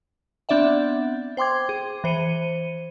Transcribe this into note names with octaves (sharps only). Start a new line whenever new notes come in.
B3 C4 D4 D5 E5 F#5
C5 G5 C6 D6 G#6
G#4
E3 C5 C#7 D#7